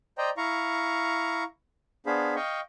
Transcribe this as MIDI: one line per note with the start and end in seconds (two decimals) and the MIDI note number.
0.18 0.30 72
0.18 0.30 74
0.18 0.30 75
0.18 0.30 79
0.18 0.30 82
0.37 1.44 64
0.37 1.44 77
0.37 1.44 82
0.37 1.44 85
2.06 2.35 59
2.06 2.35 62
2.06 2.35 68
2.06 2.35 72
2.06 2.35 77
2.06 2.35 83
2.36 2.60 75
2.36 2.60 77
2.36 2.60 79
2.36 2.60 85